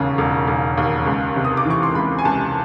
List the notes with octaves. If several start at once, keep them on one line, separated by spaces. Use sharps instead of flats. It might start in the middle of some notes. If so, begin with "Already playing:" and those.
Already playing: E1 D#2 C#3
E1
E1
D#2
C#2
C3
D#6
D6
E3 C#6
C6
C#2 B5
G#5
C#2 A5